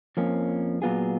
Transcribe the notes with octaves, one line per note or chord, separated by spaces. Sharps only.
F2 F3 A#3 C#4
A#2 F#3 B3 F4 G#4